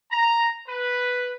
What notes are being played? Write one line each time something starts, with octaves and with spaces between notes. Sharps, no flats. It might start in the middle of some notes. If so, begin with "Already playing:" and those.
A#5
B4